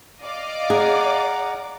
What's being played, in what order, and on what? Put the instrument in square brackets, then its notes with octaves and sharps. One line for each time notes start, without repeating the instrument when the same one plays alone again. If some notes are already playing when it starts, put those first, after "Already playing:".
[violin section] D5 D6 [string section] D#5 F5
[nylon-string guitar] G#4 [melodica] F#5 A#5